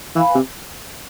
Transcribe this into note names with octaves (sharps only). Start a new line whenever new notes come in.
E3 B4 F5 G#5 B5
C3